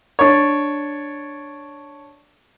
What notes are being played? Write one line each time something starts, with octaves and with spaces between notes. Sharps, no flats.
D4 C#5